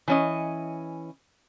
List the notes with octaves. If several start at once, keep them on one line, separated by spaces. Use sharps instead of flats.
E3 C#4 D#5